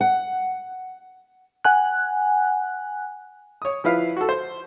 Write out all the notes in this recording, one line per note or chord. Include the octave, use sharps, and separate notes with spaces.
F#5
F#5 G#5 F#6
C#5 D#6
F3 E4 B4 F5
F#4 A4
C5